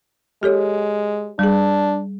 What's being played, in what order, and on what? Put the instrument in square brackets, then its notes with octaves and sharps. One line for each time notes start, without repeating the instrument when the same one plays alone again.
[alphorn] G#3 [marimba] G4 A4 C#5
[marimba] G3 G#4 [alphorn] D4